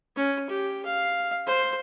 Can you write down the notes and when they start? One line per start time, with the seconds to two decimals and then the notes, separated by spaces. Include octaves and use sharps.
0.16 C#4
0.49 G4
0.85 F5
1.46 C5